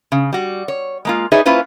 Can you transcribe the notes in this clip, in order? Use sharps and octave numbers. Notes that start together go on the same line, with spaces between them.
C#3
G3 F#4
C#5
G#3 A#3 F4
D#4 G#4 B4 C#5 D5 E5
A#3 C#4 E4 F4 B4 C5